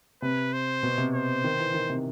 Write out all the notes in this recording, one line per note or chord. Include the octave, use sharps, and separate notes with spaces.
C3 B4
C5
B2
C3
C5
D#3
E3
D#3
C3